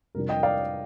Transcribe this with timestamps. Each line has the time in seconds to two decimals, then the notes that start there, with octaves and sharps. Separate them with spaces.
0.15 F2 C3 G3 D4 F4 A#4
0.29 D#5 G5
0.43 D5 F5